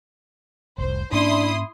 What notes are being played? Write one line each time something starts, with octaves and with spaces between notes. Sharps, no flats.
F1 C2 C5
G#2 A#3 C#4 D4 E4 C6 D#6